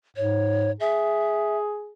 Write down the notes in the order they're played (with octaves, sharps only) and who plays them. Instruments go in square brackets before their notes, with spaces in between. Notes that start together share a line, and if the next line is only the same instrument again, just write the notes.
[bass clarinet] G#2 [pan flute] C#5
[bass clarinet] G#4 [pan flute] E5